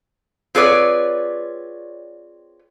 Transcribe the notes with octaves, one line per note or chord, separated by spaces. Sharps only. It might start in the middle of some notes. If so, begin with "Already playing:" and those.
C4 F4 G#4 B4 C#5 D5